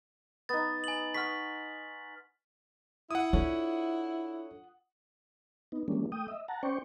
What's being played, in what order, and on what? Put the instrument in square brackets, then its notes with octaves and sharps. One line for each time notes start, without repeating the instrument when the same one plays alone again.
[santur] B3 D#4 [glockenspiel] A6
[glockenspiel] G#5 F#7
[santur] F#5 C6 C#6 [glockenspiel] F6 B6
[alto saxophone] E4 [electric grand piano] F#5 D#6
[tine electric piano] D4 A4 C#5 [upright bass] F4
[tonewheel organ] B3 D#4
E3 G3 G#3 A#3 C#4 D4
A3 G5 D#6
D#5 E5
F#5 A5 A#5
C#4 C5 D5 G5 C#6